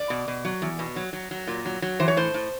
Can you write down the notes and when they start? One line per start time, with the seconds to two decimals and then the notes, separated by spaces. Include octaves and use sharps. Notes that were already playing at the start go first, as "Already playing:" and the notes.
Already playing: D5
0.10 B2
0.28 B2
0.45 F#3
0.62 E2
0.79 B2
0.96 F#3
1.13 F#3
1.31 F#3
1.47 A#2
1.65 F#3
1.82 F#3
2.00 E3 C5
2.08 C#5
2.17 A2 C5
2.34 A2